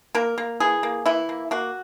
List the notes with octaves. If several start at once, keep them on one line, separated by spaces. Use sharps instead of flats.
A#3 A#4
A#3
E3 G#4
A#3
E3 E4
A#3
A#3 F#4